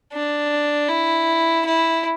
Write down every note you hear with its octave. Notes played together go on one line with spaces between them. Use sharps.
D4
E4
E4